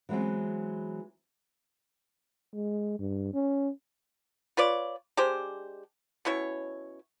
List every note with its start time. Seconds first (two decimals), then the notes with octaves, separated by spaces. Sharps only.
0.09 E3 F#3 G#3 B3 C4
2.55 G#3
2.99 G2
3.34 C#4
4.57 F4 B4 C#5 D5
5.17 G#3 D4 G4 C5
6.25 B2 C#4 E4 C#5